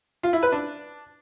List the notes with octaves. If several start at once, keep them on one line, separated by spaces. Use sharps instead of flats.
F4
E4
B4
D4